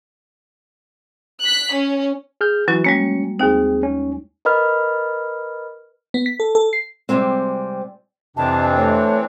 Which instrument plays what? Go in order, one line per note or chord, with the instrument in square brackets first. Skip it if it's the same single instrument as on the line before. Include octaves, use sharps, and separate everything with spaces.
[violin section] F#6 B6
C#4
[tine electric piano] G#4 F6 G6
[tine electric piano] E3 [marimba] F#3 C#4 F#4
[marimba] G3 G#3 A#3 [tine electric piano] C#4 C#7
[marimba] D#2 D#4 [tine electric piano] C4 G#4
[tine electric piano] C#4
[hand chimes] A#4 B4 D#5 B5 F6
[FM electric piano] B3
B6
A4
A4
C7
[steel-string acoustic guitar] C3 F3 G3 G#3 C4
[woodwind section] F2 C3 [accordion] E3 C4 D4 [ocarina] A5
[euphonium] A3 [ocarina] C#5